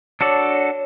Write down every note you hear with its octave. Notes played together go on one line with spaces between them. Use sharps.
D4 F#4 A4 C#5 D5